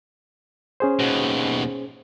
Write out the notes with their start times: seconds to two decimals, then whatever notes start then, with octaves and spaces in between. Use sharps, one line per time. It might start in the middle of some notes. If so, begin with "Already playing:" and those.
0.80 C#4 G#4 C5
0.99 D#2 B2